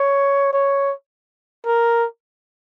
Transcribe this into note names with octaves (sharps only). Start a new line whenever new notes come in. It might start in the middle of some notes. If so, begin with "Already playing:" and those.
Already playing: C#5
C#5
A#4